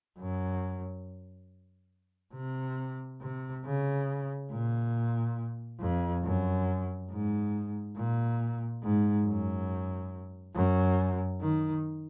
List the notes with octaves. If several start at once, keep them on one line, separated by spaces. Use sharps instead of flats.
F#2
C3
C3
C#3
A#2
F2
F#2
G#2
A#2
G#2
F#2
F#2
D#3